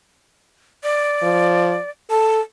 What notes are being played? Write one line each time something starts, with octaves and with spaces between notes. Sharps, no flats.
D5
F3
A4 A5